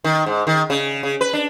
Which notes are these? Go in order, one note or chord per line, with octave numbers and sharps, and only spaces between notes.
D#3
G#2
D#3
C#3
C#3
B4
D4